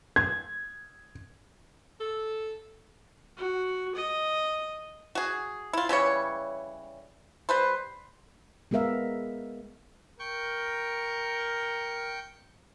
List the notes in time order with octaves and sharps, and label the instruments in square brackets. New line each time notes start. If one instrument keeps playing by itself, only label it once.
[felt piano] G#6
[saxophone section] A4
[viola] F#4
D#5
[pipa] F#4 G#4
E4 F4
C#3 E3 G3 C#5
G3 B4 C5
[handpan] G#3 B3 G#4 A#4 E5 F5
[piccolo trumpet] A#4 [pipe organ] G5 C#6 G6